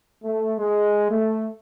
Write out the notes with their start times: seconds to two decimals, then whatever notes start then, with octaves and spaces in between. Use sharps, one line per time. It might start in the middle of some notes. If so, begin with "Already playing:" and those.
0.24 A3
0.58 G#3
1.09 A3